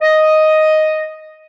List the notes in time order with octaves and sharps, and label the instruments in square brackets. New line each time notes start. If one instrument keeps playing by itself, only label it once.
[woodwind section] D#5